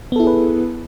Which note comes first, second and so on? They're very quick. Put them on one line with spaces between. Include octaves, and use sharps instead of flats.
B3 A4 E4 G#4 B4